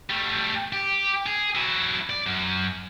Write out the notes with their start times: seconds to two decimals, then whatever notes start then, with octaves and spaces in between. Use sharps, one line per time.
0.10 G3 A3
0.73 G4
1.26 G#4
1.55 F#3 E4
2.09 D5
2.26 F#2